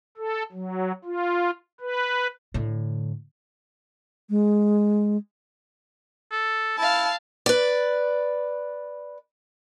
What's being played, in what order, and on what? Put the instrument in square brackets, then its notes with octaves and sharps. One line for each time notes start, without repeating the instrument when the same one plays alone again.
[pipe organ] A4
F#3
F4
B4
[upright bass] A2 D3
[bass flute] G#3
[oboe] A4
[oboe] E4 [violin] F5 A5
[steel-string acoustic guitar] B4 D5